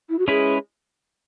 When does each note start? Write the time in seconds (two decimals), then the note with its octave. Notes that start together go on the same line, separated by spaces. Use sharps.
0.10 E4
0.19 F#4
0.28 G#3 C#4 E4 G#4 B4